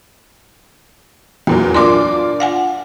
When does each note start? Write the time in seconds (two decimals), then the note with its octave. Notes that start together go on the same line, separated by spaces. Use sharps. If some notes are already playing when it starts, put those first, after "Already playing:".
1.47 E2 A#2 F#3
1.74 D4 F4 A#4 G#5 C6 D6
2.40 F5 F#5 G#5